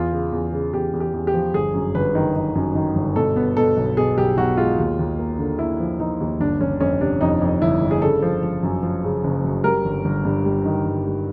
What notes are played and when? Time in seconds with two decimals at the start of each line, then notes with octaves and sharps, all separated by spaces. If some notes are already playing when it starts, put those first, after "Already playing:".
Already playing: E2 F4
0.12 C#3
0.32 E2
0.53 C#3
0.73 E2 G4
0.93 E2
1.00 G4
1.14 E2
1.27 G4
1.34 F3
1.54 G1 G#4
1.74 F#2
1.95 G1 B4
2.15 D#3
2.36 D#3
2.55 F#2
2.75 D#3
2.96 G1
3.16 B2 A4
3.36 B3
3.57 B2 A4
3.77 B1
3.97 B2 G#4
4.18 B1 G4
4.37 B1 F#4
4.57 G#3 F4
4.78 D#2
4.99 D#2
5.19 A#3
5.39 D3
5.59 A#3 E4
5.80 F3
6.00 F3 D#4
6.20 D#2
6.40 G1 D4
6.61 G1 C#4
6.81 F2 C#4
7.01 C3 D4
7.21 F2 D#4
7.42 F2
7.62 G1 E4
7.82 G1
7.91 G#4
8.02 C#3 A4
8.22 F3
8.43 F3
8.63 F#2
8.83 F3
9.04 C#3
9.24 F#1
9.44 F#2
9.64 G3 A#4
9.85 G1
10.05 G1
10.25 G2
10.45 G3
10.65 D#3
10.86 G1
11.06 G3